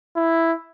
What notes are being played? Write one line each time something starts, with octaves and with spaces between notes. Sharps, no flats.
E4